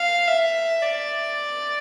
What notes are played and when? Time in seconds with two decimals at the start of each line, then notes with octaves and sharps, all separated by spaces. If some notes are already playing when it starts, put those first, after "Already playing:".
Already playing: F5
0.28 E5
0.81 D5